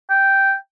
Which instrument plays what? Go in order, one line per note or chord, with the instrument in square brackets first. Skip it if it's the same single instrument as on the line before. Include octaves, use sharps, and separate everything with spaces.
[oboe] G5